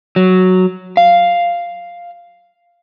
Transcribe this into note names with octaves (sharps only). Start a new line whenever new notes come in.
F#3
F5